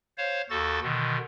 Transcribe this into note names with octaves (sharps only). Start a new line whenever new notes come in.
C5 C#5 F5
D#2 F#4 A4 A6
B2 D3 D#3